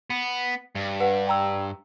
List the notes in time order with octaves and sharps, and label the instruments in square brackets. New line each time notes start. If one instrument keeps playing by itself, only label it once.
[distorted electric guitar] B3
G2
[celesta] B4 F#5
G5 A#5 E6